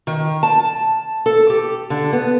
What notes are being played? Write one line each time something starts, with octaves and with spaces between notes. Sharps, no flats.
D#3
A5
A4
G4
D3
B3